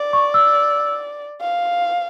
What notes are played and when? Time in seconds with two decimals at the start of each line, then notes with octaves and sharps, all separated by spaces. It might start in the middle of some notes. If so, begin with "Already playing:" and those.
Already playing: D5
0.13 C#6
0.34 E6
1.41 F5